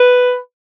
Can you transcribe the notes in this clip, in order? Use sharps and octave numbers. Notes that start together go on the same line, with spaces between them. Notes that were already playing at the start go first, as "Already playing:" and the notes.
Already playing: B4